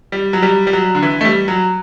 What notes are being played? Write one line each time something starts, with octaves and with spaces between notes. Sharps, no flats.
G3
F#3
G3
G3
F#3
D3
E3
A3
G3
F#3